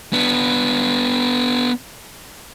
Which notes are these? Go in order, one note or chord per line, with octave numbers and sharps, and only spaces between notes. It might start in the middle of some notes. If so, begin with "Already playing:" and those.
B3 D4